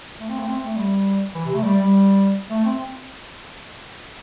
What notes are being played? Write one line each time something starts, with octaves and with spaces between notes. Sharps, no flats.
A3
C4
A3
C4
A3
G3
E3
C3
A3
G3
G3
A3
C4